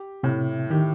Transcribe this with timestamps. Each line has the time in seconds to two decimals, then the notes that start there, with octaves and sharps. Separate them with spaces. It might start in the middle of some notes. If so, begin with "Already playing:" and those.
Already playing: G4
0.23 A2 C3
0.70 D#3 G4